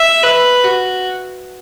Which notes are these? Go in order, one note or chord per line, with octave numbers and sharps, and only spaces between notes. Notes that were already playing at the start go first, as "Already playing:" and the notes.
Already playing: E5
B4
F#4